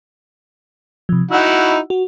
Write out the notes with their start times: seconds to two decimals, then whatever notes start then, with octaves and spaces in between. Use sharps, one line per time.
1.09 C3 F3
1.31 D#4 E4 F#4 F#5 E6
1.90 F#4